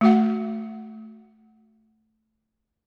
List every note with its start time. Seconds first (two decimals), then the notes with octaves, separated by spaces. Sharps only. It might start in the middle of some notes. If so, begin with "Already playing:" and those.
0.01 A3 F#4 F#5